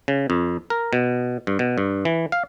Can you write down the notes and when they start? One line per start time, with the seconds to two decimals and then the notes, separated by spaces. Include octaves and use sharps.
0.08 C#3
0.30 F2
0.70 A#4
0.93 B2
1.47 G2
1.59 B2
1.78 G2
2.05 E3
2.32 F5